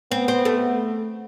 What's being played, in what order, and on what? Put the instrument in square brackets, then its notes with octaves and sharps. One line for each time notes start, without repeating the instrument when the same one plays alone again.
[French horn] B3 [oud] C4
[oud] C4
A3